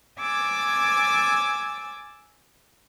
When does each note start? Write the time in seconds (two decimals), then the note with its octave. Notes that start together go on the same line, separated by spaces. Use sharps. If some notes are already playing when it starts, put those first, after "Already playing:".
0.20 G#5 D6 E6 G#6 A6